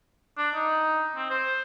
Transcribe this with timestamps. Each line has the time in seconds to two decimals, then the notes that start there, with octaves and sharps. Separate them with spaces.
0.38 D4
0.55 D#4
1.16 C4
1.30 C5